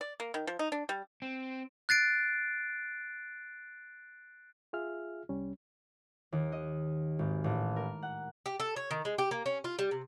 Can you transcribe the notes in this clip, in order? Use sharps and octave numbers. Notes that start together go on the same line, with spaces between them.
D5
A#3
D#3
F3
D#4
D4
G3
C4
F#6 A6 C7 D7
F4 G#4 E5 F6
C2 G3 C#4
D#2
D#5
G#1
A1
A#4
F#5
G4
A4
C#5
D#3
G#3
G4
A#3
C#4
F4
G3
C3